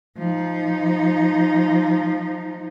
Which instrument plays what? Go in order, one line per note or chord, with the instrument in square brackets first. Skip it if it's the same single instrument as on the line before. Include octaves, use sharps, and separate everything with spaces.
[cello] F3 D#4